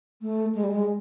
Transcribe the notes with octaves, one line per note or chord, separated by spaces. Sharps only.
A3
G#3
G3
G#3